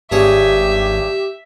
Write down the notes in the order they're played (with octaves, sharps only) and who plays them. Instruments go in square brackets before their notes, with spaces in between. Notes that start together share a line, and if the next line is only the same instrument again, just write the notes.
[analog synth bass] G#1 [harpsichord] G2 G#4 C#5 [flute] G4 [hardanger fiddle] E5